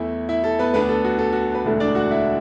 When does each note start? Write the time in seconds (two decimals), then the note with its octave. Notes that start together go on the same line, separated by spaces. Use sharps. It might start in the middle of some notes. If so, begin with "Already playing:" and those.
Already playing: E2 E3 A3 E4
0.29 E4 E5
0.44 A4
0.59 B3 B4
0.74 D2 D3 B3 D4 B4
0.89 A4
1.05 F#4
1.18 A4
1.32 F#4
1.55 B4
1.65 E1 D2 D3 A3 E4 A4
1.80 D4 D5
1.95 F#4 F#5
2.11 E4 E5